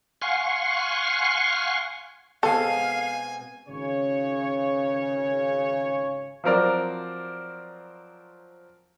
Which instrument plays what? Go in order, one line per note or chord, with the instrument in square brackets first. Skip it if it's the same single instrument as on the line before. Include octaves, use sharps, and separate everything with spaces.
[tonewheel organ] F5 F#5 G#5 C6 C#6
[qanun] B2 G#3 C4 [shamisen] A4 [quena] F5 [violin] G#5
[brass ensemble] G#1 C#3 C#5
[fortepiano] F3 F#3 C4 A#4 D5